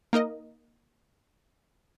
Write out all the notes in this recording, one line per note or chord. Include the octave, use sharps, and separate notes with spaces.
A#3 D#4 A#4 D#5